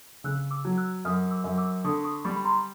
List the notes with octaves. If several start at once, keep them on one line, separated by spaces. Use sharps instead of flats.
C#3 E6 F#6
D6 E6
F#3
E6 F#6
F#2 D#6 F6
D6 E6
F#2
D6 E6
D3 C#6 D#6
C#6 D#6
G3 B5 C#6
B5
A#5 C6